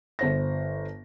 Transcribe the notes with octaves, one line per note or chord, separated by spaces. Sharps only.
G1 C5 A#6